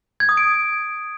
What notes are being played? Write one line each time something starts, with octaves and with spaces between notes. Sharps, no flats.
G#6
D#6
D7